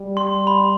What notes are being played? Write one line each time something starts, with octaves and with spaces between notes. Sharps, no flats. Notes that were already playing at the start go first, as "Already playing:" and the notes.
Already playing: G3
C6
B5